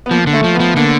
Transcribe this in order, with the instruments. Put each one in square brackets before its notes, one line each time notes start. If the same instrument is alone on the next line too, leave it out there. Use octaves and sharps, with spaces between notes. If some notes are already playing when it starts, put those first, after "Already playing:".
[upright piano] B3
[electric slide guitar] F3 [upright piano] A#3
[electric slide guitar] D3
[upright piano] A3
[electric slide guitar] F3
[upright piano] B3
[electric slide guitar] F3
[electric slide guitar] D3 [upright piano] A#3